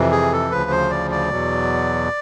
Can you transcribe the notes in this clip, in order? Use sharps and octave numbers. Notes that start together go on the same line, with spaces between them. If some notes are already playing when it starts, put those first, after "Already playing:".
Already playing: F2 C3 E3
G#4
A4
D2 C#3 F3 B4
C5
D5
D5
E2 B2 F#3